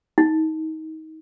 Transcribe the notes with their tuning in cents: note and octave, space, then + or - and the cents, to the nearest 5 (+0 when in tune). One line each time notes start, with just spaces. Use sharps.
D#4 +30